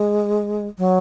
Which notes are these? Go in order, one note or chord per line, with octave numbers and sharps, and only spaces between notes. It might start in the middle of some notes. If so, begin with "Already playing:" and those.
Already playing: G#3
F#3